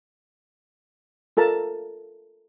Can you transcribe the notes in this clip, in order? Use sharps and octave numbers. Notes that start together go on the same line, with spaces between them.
F4 A4 A#4 A5 A#5